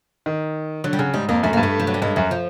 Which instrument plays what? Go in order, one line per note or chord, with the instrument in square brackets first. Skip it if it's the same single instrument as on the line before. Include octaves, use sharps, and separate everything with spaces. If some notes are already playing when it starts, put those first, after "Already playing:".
[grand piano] D#3
[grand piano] D3 [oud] F#3
[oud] G3
[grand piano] C#3 [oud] F#3
[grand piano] G#2 [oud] G3
[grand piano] F2 [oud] A#3
[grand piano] F#2 [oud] A3
[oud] A#3
[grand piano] G2
[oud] A3
F3
F#3
G3
[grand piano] G2 [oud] G#3
[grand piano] F#2 [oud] F#3
[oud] F3